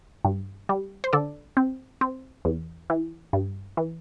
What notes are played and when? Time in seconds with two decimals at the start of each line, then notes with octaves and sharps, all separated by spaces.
0.25 G2
0.69 G3
1.04 C5
1.13 D3 A4 D5
1.57 C4
2.01 C4
2.45 E2
2.90 E3
3.33 G2
3.77 E3